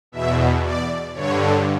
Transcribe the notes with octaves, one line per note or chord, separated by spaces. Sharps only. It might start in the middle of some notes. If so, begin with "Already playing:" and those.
E2 B2 E5
D5
G2 D3 C#5